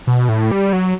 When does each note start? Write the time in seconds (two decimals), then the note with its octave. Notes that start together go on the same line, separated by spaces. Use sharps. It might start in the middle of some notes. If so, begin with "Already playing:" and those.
0.07 B2
0.29 A2
0.51 G3
0.73 F#3